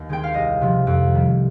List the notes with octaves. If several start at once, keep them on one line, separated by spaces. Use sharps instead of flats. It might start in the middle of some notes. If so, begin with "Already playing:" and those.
Already playing: D#2
D#3 G#3 C4 G5
F5
C2 D#5
C3 F3
F2
D#3 G3